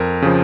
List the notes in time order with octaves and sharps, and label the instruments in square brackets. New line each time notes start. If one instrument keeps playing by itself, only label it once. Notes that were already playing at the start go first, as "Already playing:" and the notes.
Already playing: [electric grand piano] F2 A#4
C#3 F3